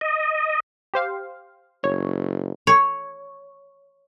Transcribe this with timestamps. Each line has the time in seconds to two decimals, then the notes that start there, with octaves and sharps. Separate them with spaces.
0.01 D#5
0.94 G4 C5 F5
1.84 F#1 C#5
2.67 C#5